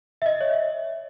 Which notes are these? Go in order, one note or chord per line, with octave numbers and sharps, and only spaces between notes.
E5
D#5
C#5